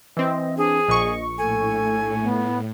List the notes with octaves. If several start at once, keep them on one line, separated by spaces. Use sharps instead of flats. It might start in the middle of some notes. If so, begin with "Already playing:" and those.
E3 C4 D#5
D4 G#4
A#1 D#5 C#6
A2 A4 G#5
B3